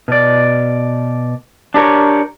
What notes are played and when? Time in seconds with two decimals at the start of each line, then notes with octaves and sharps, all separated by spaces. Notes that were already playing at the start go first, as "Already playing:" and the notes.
0.08 B2 D5
1.74 D4 G4 A#4 C#5